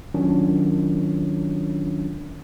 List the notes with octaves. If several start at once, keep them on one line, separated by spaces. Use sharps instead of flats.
D#3 F#3 C#4 D4 F4